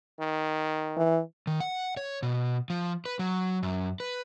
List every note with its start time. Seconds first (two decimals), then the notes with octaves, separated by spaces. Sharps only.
0.20 D#3
0.97 E3
1.47 D#3
1.60 F#5
1.97 C#5
2.23 B2
2.70 F3
3.06 B4
3.19 F#3
3.63 F#2
4.00 B4